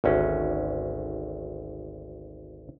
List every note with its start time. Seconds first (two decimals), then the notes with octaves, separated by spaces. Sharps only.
0.04 G#1 D2 C#4